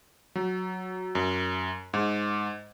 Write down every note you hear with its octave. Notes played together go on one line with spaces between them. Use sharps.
F#3
F#2
G#2